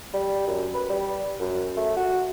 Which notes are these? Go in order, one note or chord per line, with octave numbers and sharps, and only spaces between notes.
G3
F#2
B4
G3
F#2
A3
F#4